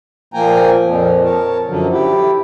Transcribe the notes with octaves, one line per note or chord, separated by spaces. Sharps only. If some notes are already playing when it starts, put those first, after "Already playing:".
A#2 F3 A#3 G5 G#5 A#5
F2 A#2 F3
A#4 C#5 A5
F#2 D3 F3 F#3
E4 G4